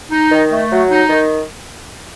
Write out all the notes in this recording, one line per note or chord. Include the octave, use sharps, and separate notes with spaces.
D#4
D#3
A3
F#3
D#4
D#3